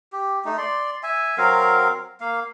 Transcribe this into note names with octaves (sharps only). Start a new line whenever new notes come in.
G4
A3 D#4
D5 C6
E5 G#5
F#3 C4 A#4 F5
A#3 F5